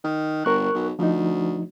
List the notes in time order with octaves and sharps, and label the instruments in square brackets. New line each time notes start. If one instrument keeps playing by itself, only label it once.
[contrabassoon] D#3
[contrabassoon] G1 [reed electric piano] A#4 C#6 F#6
[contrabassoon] B1
[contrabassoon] D2 [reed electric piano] F3 D#4